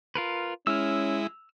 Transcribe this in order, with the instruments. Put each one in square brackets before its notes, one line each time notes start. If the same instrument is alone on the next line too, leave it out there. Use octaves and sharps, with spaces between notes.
[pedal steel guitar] F4 A#4 B4
[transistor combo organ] G#3 E4 [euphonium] C#4 [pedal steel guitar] E6 F6